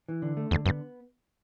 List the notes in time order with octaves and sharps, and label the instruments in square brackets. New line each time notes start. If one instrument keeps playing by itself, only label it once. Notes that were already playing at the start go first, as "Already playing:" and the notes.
[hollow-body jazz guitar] E3
D3
A3
[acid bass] E2 [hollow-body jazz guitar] D3
[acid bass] F#2 [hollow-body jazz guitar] B3